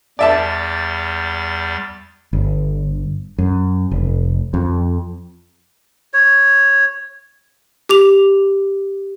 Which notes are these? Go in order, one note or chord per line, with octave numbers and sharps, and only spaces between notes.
E2 G3 D5 E5 A5 A6
G1
F#2
F1
F2
C#5
G4 D6 F7